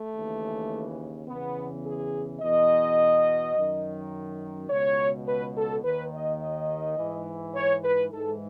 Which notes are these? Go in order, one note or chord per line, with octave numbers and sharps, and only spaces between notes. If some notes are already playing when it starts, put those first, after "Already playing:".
Already playing: A3
D#2 C#3 E3
E2 C#3 E3 B3
G#4
E2 B2 D#5
F#2 D#3
C#2 B2 C#5
B4
A4
D#2 D#3 B4
D#5
D#5
G#2 E3
C#5
B4
G#2 E3 A4